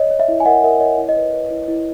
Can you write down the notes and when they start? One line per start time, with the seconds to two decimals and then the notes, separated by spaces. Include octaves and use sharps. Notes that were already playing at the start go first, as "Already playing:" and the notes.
Already playing: C#5 D#5
0.11 C#5
0.20 E5
0.28 E4
0.40 G#5
0.45 A#4 D#5 F#5
0.64 A#4 E5
0.80 C#5 D#5
0.98 E4
1.09 D#5
1.17 B4
1.34 B4
1.50 E4
1.68 E4